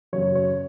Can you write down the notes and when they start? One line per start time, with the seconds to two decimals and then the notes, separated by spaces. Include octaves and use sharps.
0.13 F#2 C#3 F#3 C#5
0.35 C#5